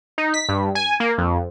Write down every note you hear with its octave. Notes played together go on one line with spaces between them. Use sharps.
D#4
B6
G2
G#5
A#3
F2